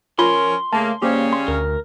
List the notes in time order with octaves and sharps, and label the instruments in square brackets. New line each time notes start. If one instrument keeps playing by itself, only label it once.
[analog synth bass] F3 [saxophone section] C#4 A#4 [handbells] F4 B5 [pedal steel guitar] C6
[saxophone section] C#3 A#3 [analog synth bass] A3 [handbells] A5
[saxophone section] C#3 G3 C#4 [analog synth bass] A#3 [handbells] G4 C5
[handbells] C6
[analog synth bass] D2 [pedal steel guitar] A#4